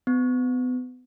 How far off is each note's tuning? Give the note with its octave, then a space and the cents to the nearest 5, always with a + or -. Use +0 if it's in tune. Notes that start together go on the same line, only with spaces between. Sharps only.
B3 +35